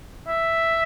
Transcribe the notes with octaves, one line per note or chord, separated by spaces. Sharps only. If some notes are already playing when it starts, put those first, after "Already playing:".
E5